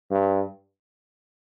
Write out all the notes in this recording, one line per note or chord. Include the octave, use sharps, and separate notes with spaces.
G2